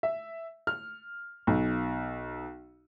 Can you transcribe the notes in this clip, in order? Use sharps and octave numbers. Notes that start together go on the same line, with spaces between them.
E5
F6
B1